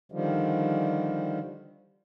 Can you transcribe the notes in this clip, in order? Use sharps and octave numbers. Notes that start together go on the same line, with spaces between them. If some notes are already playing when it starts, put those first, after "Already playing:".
D3 D#3 F3 G3